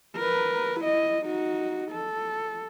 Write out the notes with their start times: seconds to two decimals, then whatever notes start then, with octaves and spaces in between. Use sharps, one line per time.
0.16 A#4 B4
0.80 E4 D#5
1.25 D#4 F#4
1.91 A4